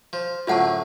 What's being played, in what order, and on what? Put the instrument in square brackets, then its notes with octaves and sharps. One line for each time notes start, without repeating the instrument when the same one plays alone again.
[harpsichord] F3
[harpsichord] F#2 A2 D3 [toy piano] F4 F#5 A5